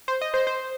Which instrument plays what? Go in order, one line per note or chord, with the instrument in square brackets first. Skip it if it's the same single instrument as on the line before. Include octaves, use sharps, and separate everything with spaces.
[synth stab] C5
D#5
C5
C5